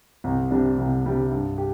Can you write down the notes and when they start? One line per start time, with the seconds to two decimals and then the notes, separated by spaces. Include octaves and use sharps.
0.24 C2
0.51 C3 G3 D4
0.78 C2
1.05 C3 G3 D4
1.31 G2
1.58 G4